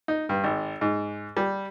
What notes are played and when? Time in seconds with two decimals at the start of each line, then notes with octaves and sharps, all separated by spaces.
0.08 D#4
0.29 G2
0.44 G#1
0.81 G#2
1.37 G3